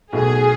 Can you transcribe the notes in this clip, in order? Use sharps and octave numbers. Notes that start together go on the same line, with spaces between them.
B1 B2 A3 G#4